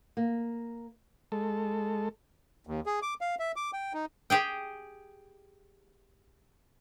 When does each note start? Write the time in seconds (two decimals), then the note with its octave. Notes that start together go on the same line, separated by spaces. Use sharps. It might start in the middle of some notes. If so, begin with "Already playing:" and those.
0.17 A#3
1.32 G#3 A4
2.67 D#2
2.86 G#4
3.02 D6
3.21 F5
3.39 E5
3.56 D6
3.73 G5
3.93 D#4
4.30 G4 G#4 G5